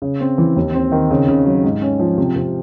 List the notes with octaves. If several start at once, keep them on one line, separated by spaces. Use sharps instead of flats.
C#3
C4
E3
D#2
C4
D#3
C#3
C#3
F#3
G#2
C#4
F3
C3
C3